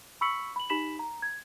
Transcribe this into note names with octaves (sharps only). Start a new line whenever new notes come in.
B5 C#6 E6 B6 C#7 F#7
B5 F#7
D#4 G4 B5 B6 E7 F#7
A#5
G#6